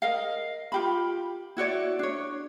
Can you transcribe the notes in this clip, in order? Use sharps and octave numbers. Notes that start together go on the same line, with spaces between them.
A#4 D#5 F5
F4 G4 B5
E4 F#4 C#5 D5
D4 C#5